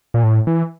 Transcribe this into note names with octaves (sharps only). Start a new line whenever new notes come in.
A#2
A2
E3